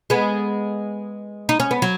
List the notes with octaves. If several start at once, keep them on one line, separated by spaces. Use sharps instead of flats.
G#3 B3
D#4
C#4
B3
F#3